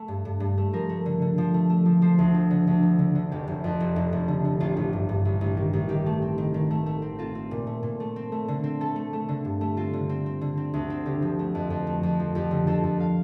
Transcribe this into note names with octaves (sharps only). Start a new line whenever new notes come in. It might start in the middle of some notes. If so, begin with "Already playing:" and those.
Already playing: A3
G2
G2
G2
A3
F3 A#4
A3
D3
D3
F3
A3
A3
F3
F3 C5
D2
F3
D3
D2
F3
D3
D3
F1 G4
F1
F2
F1
F1
F1
D3
D3
A1 F4
A1
G2
G2
A1
A1
D#3
A1
D#3 G4
A3
C4
D#3
D#3
A3
A3
C4
C4 F4
C4
A#2
A3
A#2
A3
C4
A3
D3
C4
A3 A4
A3
A3
D3
G2
A3
C4 F4
D3
C4
C4
D3
C4
D2
C4
D3 G4
F3
A3
F2
F2
A3
F2
F3
F2 G4
D3
F2 A4
F2
F5